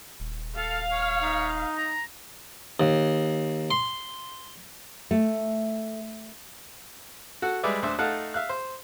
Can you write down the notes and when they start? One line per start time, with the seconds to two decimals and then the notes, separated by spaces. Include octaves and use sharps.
0.20 D#1
0.56 A4 F5
0.92 C#5
1.23 D#4
1.77 A#5
2.80 D#2
3.71 C6
5.11 A3
7.42 F#4 A4 F#5
7.63 G3 G#3 G#4 B4 D5 E5
7.82 D2 D4 C5 E5
7.99 A3 D#4 F5 F#5 A5 F#6
8.34 E5 F5 F#6
8.49 C5